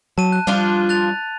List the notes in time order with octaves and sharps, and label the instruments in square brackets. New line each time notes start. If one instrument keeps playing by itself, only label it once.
[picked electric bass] F#3 [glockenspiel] A5 D#7
[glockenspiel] F#6
[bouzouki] F3 D4 F4 [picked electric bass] G3
[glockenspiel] F#6 A6 F7